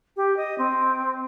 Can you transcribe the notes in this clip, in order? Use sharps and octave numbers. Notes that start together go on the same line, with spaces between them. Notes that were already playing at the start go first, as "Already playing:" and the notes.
G4
D#5
C4